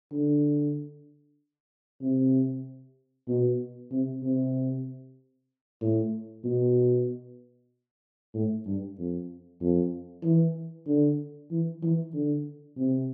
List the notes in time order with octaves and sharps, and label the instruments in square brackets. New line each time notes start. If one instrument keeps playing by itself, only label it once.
[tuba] D3
C3
B2
C3
C3
A2
B2
A2
G2
F2
F2
E3
D3
E3
E3
D3
C3